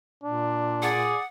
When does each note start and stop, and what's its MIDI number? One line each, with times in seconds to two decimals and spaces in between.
0.24 1.13 46
0.24 0.92 62
0.82 1.18 68
0.82 1.18 74
0.82 1.26 78